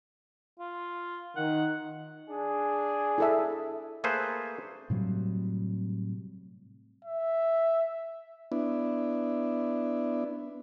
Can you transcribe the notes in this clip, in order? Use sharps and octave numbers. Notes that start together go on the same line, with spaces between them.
F4
D#3 F#5
D4 G#4
E4 A4 E5
A3 A#3 G#4 A4 B4 C5
A2 C3 F#3 G3
E5
B3 D4 E4